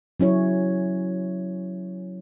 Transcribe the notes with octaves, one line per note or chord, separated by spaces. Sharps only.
F#3 C#4 E4 C#5